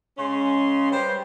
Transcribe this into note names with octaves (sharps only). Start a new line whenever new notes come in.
C#3 G#3 C#4 C6
G3 B4 C5